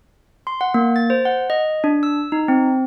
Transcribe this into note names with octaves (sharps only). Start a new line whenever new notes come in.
C6
F#5
A#3
A6
C5
F#5
D#5
D4
E6
D#4
C4